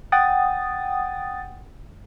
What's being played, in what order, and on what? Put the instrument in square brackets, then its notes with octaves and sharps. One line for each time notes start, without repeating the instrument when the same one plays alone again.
[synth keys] F#5 G5 D#6 A6